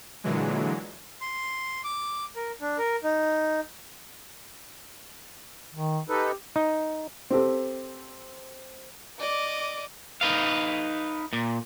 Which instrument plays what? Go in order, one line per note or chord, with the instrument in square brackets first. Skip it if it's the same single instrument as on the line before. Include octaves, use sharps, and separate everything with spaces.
[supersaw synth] A#2 D3 E3 F#3 G#3
[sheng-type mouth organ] C6
D6
A#4
D4
A#4
D#4
[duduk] D#3
[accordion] D#4 A4 B4 [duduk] G4
[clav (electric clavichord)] D#4
[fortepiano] C4 G4 A4
[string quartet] D5 D#5 D6
[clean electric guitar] D#4 B4 F5
A#2